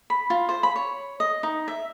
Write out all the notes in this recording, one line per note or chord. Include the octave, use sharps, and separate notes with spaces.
B5
F4
C5
B5
C#5
D#5
D#4
E5